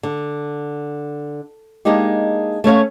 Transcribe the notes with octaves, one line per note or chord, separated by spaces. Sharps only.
D3
G#3 A#3 D4 D#4 G4
A3 C#4 C#5 F5